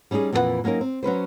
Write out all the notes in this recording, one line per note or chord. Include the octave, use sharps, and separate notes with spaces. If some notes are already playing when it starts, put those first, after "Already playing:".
G3 C#4 D#4 E4 G#4
F2 A#2 E3 F4 B4 F#5
F#3 A#3 C#4 D#4 A#4
C4
F#3 C#4 B4 C5